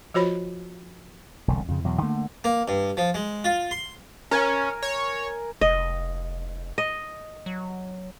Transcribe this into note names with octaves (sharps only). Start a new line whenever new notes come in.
F3 F4 F#4 C5 C#5 B5
E1 C2 D3
F2 C#3
E2 B2 F#3
D3 A3 A#3
A#3
G2
F3
G#3
F4
C6
C#4 A#4 G#5
C#5
F1 D#5
D#5
F#3